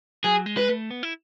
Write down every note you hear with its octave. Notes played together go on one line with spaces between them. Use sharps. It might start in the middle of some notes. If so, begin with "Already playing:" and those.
F#3 G#4
G#3
B4
A3
B3
E4